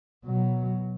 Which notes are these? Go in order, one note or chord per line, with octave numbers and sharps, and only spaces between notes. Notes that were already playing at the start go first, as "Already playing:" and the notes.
B2 F#3